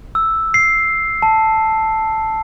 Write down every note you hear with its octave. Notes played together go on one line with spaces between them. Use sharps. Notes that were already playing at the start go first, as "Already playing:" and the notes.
E6
C7
A5